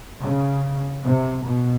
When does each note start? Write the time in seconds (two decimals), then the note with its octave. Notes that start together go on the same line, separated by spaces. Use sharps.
0.22 C#3
1.03 C3
1.43 B2